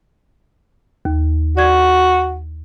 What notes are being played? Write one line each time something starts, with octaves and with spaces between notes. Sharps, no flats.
D#2
F#4 D5 G#6